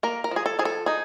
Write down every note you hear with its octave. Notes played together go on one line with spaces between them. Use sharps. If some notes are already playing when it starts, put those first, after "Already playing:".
A#3 A#4
A#4
F3 G#4
A4
F3 G#4
A4
D#4 G#4